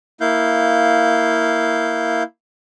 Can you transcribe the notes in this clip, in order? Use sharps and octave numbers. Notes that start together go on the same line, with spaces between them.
A#3 E4 F5 G6